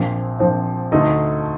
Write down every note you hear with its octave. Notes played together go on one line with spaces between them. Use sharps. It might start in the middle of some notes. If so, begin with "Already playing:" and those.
Already playing: A#1 A#2 F3 C4
A#1 A#2 F3 C4
D2 D3 A3 D#4 A4